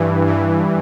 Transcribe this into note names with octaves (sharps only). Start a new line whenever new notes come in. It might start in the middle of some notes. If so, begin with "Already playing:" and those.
Already playing: G2 E3
G2 E3